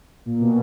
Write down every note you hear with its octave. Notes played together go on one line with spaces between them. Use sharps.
A#2
B2